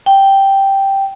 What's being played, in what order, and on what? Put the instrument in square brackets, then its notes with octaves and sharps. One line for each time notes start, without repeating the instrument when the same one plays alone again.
[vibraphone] G5